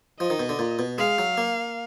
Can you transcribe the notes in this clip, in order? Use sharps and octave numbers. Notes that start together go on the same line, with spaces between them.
F3 D#5
D#3
B2
D3
A#2
B2
G#3 F5
F#3
A#3